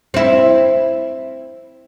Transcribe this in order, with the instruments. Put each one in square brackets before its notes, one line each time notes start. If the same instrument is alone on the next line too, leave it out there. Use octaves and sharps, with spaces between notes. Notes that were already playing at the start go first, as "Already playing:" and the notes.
[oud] C4 E4